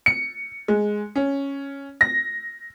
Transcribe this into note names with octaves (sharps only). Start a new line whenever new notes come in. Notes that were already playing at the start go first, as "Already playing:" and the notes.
C#7
G#3
C#4
A#6